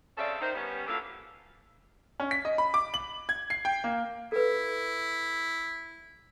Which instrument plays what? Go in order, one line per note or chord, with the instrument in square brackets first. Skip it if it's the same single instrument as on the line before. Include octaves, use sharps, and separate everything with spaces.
[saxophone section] C#3 C4 C#4 A4 D5 E5
D#3 D#4 C5
G3 B3 C#4
A#2 F#3 D4 E4 A4 F5
[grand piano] C#4
B6
D#5
B5
D6
F#7
G#6
C7
G5
A#3
[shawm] E4 [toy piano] A4 B4